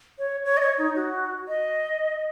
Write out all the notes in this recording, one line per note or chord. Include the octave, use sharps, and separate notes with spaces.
C#5
C#5
D#5
C#5
D#4
F#4
D#5